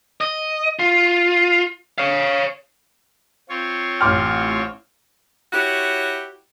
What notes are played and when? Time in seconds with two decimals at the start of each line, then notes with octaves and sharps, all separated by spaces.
0.21 D#5
0.79 F4
1.98 C#5 F5
3.49 C4 F4 C#5
4.01 A1 G5 C6 D6 F6
5.53 E4 F#4 G4 C#5